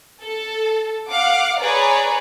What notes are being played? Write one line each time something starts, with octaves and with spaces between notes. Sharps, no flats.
A4
F5 F#5 D6
G#4 B4 C#5 D5 A#5